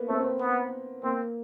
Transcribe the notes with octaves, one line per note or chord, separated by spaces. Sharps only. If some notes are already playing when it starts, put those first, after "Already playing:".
Already playing: A#3 B3
A3 C4
C4
B3
B3
A#3 C4